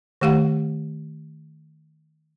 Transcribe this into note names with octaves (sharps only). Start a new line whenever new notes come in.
D#3 A3 G4 F5 F#5